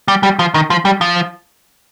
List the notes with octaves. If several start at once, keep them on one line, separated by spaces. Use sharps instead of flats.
G3
G3
F3
D#3
F3
G3
F3